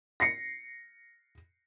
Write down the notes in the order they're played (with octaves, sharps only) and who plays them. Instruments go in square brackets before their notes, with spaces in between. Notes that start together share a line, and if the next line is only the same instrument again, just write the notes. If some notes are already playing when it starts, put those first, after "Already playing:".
[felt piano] A#6 C7 C#7